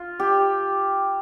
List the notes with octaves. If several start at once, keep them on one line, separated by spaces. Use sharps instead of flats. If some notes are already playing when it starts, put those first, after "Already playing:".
Already playing: F4
G4